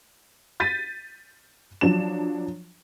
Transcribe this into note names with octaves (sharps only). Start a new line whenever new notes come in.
G6 A6 B6 D#7
F3 F#3 D4 E7